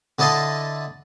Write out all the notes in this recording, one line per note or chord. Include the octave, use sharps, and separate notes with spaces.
D3 D4 E4 D#5 A5 C6